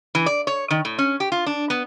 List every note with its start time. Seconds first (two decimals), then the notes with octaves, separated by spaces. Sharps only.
0.15 E3
0.26 D5
0.47 C#5
0.70 D#3
0.85 A2
0.98 C#4
1.20 G4
1.32 F4
1.46 D4
1.70 B3